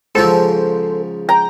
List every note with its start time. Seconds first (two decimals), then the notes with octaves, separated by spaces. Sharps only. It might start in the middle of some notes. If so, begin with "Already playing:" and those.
0.15 G#2 C#3 F3 A4 C5
1.29 G5 A#5